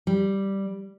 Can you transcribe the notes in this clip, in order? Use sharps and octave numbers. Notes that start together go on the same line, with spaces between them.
G3